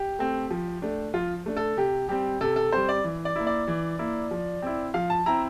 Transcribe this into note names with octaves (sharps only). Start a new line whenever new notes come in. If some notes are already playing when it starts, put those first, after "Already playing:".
Already playing: G4
A3 C4
F3
A3 D4
F3 F4
A3 D4
A4
C3 G4
G3 C4 G4
C3 A4
A4
G3 C4 C5
D5
E3
D5
A#3 E4
D5
E3
A#3 E4
F3
C4 E4
F3 F5
A5
C4 E4 A#5